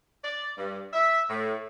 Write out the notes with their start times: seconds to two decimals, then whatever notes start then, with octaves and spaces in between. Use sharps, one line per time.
0.24 D5
0.58 G2
0.92 E5
1.30 A2